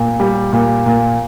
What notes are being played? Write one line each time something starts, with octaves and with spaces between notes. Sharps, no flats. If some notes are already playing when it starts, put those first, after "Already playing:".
Already playing: A#2
G3
A#2
A#2